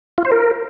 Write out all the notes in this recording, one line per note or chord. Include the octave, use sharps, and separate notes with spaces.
F4
C5
A#4